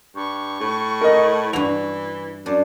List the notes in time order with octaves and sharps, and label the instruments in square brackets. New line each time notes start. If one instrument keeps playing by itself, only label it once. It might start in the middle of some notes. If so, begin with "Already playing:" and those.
[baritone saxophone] G2 [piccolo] C#6
[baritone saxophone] A2
[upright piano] A#4 D#5
[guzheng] G2 F#4 [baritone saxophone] E3 [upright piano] F7
[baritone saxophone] F#2 [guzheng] D4